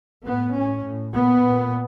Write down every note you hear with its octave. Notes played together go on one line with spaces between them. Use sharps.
A2 B3
A2 C#4
A2
A#2 B3
A#2